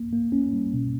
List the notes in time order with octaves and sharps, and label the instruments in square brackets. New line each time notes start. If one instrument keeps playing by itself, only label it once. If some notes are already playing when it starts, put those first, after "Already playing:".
Already playing: [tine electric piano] A#3
A#3
C#4
G3
B2